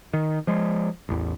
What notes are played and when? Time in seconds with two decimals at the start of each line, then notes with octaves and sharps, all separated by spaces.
0.13 D#3
0.47 F3 G#3
1.09 A1 E2